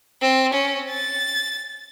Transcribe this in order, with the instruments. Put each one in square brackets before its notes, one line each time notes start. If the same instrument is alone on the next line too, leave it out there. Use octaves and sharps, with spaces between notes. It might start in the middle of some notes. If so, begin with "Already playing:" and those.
[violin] C4
C#4
A6